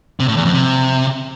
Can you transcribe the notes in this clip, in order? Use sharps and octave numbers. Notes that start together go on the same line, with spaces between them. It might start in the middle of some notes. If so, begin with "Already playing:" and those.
C3
A2
E2
F2
C3